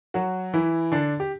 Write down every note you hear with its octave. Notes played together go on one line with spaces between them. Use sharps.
F#3 F#4
E3 E4
D3 D4
G4